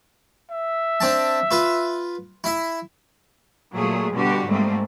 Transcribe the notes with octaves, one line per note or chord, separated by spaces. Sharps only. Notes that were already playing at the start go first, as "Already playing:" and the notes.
E5
C4 D4 A5
F4 B4
E4 E5
A#2 F#3 A3 G#4
B2 D3 G3 F#4 G4
G#2 G3 A3 A#3 C4